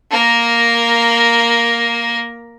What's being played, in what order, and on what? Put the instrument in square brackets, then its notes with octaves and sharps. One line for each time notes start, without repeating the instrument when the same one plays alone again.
[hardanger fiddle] A#3 A#4